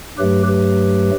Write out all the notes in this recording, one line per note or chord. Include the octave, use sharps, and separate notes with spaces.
G2 F#3 A3 G4 B4
G4 B4